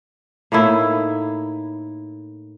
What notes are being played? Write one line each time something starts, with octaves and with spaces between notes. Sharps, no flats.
A2 A#3 D#4 E4